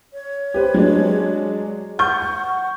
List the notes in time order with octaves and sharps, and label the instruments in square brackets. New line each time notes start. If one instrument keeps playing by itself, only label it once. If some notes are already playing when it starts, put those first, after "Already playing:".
[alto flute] C#5
[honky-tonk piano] G4 B4 C5
F#3 G#3 D4
[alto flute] F#5 [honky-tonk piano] C#6 G6